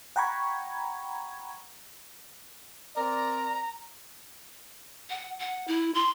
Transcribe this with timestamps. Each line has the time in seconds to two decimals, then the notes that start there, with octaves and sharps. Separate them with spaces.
0.16 F#5 G5 A#5 B5 C#6 G#6
2.96 C4 A#4 D5 A#5
5.10 F#5
5.40 F#5
5.68 E4
5.94 C6